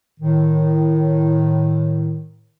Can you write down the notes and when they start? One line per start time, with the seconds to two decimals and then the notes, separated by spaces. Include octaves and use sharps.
0.20 A2 D#3